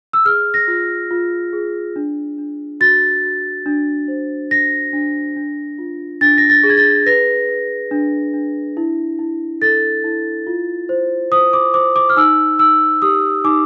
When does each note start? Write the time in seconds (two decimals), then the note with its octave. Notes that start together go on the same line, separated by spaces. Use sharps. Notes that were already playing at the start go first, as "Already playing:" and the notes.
0.13 E6
0.25 G#4 F6
0.54 A#6
0.68 F4
1.11 F4
1.53 G#4
1.96 D4
2.38 D4
2.81 F#4 A6
3.24 F#4
3.66 D4
4.08 C5
4.51 D4 A#6
4.93 D4
5.36 D4
5.78 F4
6.21 D4 A6
6.38 A#6
6.50 A6
6.63 G#4
6.70 G#6
6.77 A6
7.06 B4 A#6
7.49 B4
7.91 D4
8.34 D4
8.77 E4
9.19 E4
9.61 A4 A6
10.04 E4
10.47 F4
10.89 C5
11.32 C5 D#6
11.53 D6
11.74 C5 D6
11.96 D6
12.09 F6
12.17 D#4 E6
12.59 D#4 E6
13.02 G4 D#6
13.44 D#4 D6